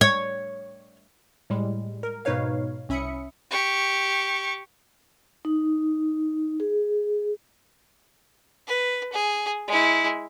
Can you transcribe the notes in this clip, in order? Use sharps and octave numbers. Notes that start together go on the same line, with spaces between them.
C#5
A2 G3 G#3
A#4
G#2 B2 D#4 B4 C#5 F5
C2 C#4 E5 B5 D#6 C#7
G4 C#6
D#4
G#4
B4
G#4
G#3 E4